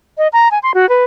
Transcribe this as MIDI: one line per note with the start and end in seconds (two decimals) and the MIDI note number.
0.18 0.28 75
0.33 0.48 82
0.51 0.59 80
0.63 0.72 84
0.74 0.88 66
0.89 1.04 71